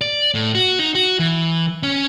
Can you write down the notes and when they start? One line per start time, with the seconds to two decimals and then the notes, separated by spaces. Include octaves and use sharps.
0.01 D5
0.34 A2
0.55 F#4
0.79 D#4
0.95 F#4
1.19 E3
1.83 C#4